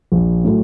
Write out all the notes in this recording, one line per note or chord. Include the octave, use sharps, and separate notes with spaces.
A#1
A2 F#3 A3